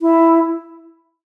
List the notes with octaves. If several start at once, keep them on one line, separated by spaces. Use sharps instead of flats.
E4